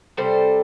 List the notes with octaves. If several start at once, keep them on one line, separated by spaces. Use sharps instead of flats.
C3 G3 A4 C5